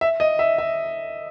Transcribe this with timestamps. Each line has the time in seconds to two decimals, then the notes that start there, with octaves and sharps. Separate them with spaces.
0.01 E5
0.20 D#5
0.39 E5
0.58 E5